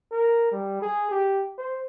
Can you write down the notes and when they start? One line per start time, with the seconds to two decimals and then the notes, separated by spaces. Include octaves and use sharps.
0.12 A#4
0.52 G3
0.82 G#4
1.11 G4
1.58 C5